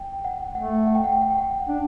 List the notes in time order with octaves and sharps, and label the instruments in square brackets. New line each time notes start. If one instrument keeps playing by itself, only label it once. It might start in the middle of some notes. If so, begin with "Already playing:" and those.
Already playing: [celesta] G5
F#5
[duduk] A3 [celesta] F#5
[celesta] F#5
G5
F#5
G5
F#5
G5
F#5
[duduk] D4